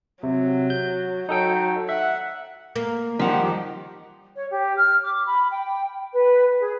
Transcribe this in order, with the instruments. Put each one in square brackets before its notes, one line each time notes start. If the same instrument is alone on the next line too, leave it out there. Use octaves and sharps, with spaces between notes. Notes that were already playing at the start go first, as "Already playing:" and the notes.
[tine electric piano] C3 [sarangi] F#3
[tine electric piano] G6
[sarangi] F#3 [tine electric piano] D#4 A4 G5
[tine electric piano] E5 [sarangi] F#5
[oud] A#3
[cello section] D#3 G4 [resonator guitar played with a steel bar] F3 F#5 [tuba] G3
[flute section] C#5
G4
F6
D6
B5
G5
B4
G#4